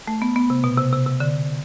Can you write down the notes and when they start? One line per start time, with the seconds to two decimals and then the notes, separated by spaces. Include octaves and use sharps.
0.08 A3
0.22 B3
0.36 B3
0.50 C3
0.64 B2
0.78 C3
0.93 C3
1.06 C3
1.20 D3